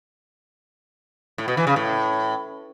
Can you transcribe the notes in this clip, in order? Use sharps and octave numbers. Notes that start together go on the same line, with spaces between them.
A2
B2
E3
C#3
A2